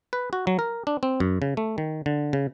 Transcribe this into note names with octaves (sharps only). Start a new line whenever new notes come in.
B4
F#4
F#3
A#4
D4
C4
F#2
C#3
A3
D#3
D3
C#3